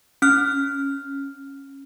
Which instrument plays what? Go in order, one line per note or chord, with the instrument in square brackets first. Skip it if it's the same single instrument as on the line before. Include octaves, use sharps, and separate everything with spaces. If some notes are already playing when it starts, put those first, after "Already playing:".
[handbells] C#4 F6